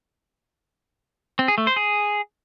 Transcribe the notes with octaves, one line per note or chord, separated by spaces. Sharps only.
C4
G#4
A3
C5
G#4